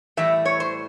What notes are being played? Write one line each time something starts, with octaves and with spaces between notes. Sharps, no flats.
A2 E3 G3 E5
C#5
C5